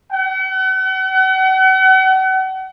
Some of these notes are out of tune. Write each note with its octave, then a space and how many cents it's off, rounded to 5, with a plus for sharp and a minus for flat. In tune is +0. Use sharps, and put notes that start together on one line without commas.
F#5 +40